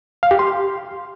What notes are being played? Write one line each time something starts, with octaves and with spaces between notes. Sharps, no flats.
F5
G4
C6